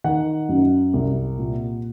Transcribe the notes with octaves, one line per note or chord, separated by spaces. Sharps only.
D#3 F#5
F#2
C2
A#2